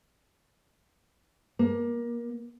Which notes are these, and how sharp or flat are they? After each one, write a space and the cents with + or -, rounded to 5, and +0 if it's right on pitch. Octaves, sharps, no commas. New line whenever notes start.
A#3 +25